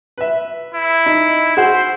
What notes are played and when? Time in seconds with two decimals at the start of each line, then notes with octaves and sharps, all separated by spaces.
0.18 B4 E5
0.74 E4
1.06 D#4
1.57 F#4 G#4 C5